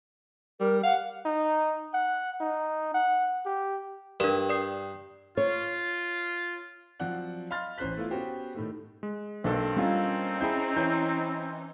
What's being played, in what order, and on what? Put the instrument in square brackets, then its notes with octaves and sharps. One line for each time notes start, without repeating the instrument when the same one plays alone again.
[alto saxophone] G3 [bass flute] A#4
[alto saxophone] F5 [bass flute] F#5
[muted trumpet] D#4
F#5
D#4
F#5
G4
[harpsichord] G2 [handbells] D4 A#4
[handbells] D5 D#6 C7
[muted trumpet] F4 [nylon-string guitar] C#5
[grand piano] F3 F#3 C4 D5 F#5 F#6
D#5 F5 B5 C6 F6 A6
A1 C#4 C5 C6 F#6 B6
A3 B3 E4 F4
B3 C#4 F#4 G4 C5
A2 D#3 A3
[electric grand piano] G#3
[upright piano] B1 [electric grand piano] A#3 D4 A4 [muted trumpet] C4
[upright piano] G3 F4 [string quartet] C#4 D#4
[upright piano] E4 G#4 G5 [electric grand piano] B5 G6
[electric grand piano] E3 E4 G6 [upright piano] C#5